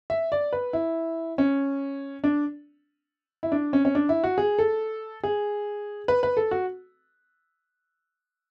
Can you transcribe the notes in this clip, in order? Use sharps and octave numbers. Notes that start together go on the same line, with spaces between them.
E5
D5
B4
E4
C#4
D4
E4
D4
C#4
C#4
D4
E4
F#4
G#4
A4
G#4
B4
B4
A4
F#4